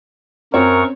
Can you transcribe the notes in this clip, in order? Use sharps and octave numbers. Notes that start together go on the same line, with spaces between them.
F#2 C4 A#4 C#5 C#6